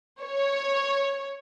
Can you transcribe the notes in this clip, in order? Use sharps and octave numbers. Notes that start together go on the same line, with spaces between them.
C#5